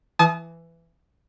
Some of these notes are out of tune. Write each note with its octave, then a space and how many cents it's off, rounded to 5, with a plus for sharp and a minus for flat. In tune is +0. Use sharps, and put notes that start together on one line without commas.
E3 +15 A5 -40 D#6 +0